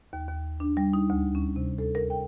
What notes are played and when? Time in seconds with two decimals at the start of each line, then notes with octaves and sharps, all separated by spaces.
0.13 D#2
0.29 D#2
0.60 D4
0.77 G3
0.93 D#4
1.10 D2
1.35 C#4
1.56 C3
1.78 A4
1.95 A#4
2.10 G5